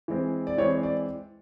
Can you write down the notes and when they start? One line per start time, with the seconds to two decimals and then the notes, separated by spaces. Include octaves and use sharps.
0.08 E3 G#3 C4
0.47 D5
0.58 E3 G#3 C4 C#5
0.83 D5